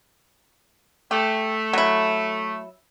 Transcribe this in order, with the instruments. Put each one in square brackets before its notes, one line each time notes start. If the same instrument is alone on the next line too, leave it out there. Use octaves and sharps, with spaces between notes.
[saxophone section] A3 [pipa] G4
[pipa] F#3 E4